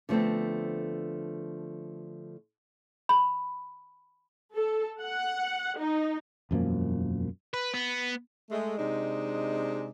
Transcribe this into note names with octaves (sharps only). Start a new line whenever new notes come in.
D3 F3 A3 B3 C4
B5
A4
F#5
D#4
E1 F#2 F3 A#3
B4
B3
G#3 A3
C3 G#3 D4 D#4